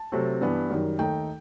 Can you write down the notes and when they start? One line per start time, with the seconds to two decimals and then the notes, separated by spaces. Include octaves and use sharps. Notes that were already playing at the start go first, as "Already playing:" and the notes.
Already playing: A5
0.12 C3 F#3 A3 C4
0.41 G2 E3 G3 B3
0.70 F#2 D#3 G3
0.99 D#2 D#3 A3 D#4 G5